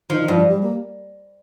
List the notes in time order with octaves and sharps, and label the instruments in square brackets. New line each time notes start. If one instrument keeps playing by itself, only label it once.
[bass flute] D#3 [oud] F3
[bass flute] D#3
[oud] G2 [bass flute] F3
[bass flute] G3
A#3